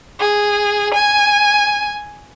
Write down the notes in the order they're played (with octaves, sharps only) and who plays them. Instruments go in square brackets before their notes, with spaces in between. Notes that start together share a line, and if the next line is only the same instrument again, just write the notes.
[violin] G#4
G#5